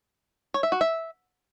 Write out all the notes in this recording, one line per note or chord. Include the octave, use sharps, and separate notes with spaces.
C#5
E5
F#4
E5